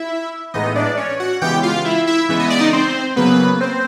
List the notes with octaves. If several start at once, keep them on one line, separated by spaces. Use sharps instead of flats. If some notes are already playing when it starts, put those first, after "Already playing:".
Already playing: E4 E5
A2 E3 G#3 B3 D#4 D#5
D4 D5
C#4 C#5
F#4 F#5
C#3 E3 G#3 B3 G4 G5
F4 F5
E4 E5
E4 E5
C#3 E3 G#3 B3 E5
D#5
D5
D#4 D#5
C4 C5
C#3 F#3 A#3 B3 B4
C4 C5